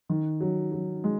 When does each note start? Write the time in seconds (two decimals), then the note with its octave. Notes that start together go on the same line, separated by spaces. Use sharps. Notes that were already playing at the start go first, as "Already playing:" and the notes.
0.09 D#3
0.40 F#3
0.72 F#3
1.04 G#3